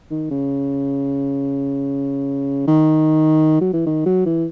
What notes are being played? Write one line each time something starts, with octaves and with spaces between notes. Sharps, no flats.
D#3
C#3
D#3
F#3
E3
D#3
F#3
E3